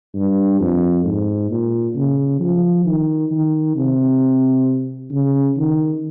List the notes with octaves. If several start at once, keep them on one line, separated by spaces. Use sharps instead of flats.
G2
F2
G#2
A#2
C#3
F3
D#3
D#3
C3
C#3
D#3